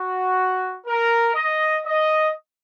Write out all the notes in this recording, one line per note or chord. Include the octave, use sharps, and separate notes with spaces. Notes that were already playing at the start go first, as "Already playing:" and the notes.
Already playing: F#4
A#4
D#5
D#5